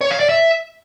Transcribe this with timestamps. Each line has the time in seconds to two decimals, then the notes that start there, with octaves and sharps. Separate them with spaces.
0.01 C#5
0.11 F5
0.20 D5
0.29 E5